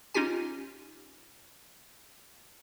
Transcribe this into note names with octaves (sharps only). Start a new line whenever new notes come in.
C#4 D#4 F4 G4 G#5